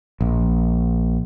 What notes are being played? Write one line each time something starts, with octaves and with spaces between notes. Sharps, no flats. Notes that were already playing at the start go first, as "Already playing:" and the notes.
A#1